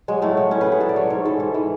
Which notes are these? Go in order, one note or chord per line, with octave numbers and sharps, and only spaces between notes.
F#3 G#3
A2 A3
F#3
A2 C#4
B4
F#3
G#4
A2 A4
D5
F#3 C#5
G#2 C#5
E3 A4
G#2
E3